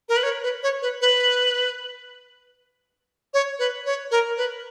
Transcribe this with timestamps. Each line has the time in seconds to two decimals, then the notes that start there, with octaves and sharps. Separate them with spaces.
0.09 A#4
0.17 B4
0.23 C#5
0.43 B4
0.63 C#5
0.82 B4
1.01 B4
3.34 C#5
3.59 B4
3.86 C#5
4.11 A#4
4.37 B4